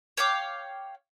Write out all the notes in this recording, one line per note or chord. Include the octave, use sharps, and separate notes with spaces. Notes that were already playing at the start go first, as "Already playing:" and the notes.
C#5 F5 G5 D6